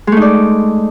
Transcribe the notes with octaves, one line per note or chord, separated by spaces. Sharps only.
G#3 A3 D#4 D5